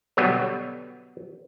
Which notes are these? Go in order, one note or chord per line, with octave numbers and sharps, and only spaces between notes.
B2 D3 F#3 G3 B3